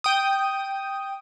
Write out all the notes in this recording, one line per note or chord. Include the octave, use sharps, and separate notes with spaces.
G5 D#6